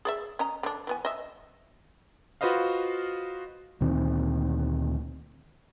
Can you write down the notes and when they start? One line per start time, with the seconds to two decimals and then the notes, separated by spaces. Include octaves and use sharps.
0.05 G#4 D5 E5
0.39 C#4 D#5 A#5
0.63 D3 D4
0.87 E3 B3 G#5
1.05 D#5 E5
2.41 F4 F#4 B4 C5 D#5 F5
3.81 D2 A#2 D#3 C4